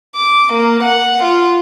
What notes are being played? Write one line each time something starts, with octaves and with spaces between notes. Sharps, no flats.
D6
A#3
F#5
F4